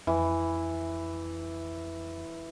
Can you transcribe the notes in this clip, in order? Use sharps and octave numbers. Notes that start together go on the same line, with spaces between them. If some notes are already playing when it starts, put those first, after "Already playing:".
F2 E3